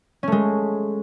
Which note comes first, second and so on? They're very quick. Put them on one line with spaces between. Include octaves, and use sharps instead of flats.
C#4 A3 G#3